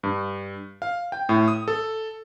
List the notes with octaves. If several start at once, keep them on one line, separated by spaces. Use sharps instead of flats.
G2
F5
G5
A2
D#6
A4